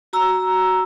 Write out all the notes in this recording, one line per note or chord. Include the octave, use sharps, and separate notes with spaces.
F#4 A#5 E6